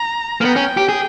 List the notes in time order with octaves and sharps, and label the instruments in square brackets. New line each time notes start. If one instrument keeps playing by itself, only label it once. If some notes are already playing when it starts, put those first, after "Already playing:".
Already playing: [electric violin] A#5
[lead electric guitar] A#3
[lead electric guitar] B3 [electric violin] G5
[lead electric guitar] C#4
G4
G#4